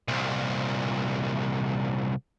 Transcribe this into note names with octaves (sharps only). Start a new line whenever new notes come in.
C2 A#2